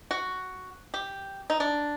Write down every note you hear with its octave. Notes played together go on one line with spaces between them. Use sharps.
F#4
G4
D#4
D4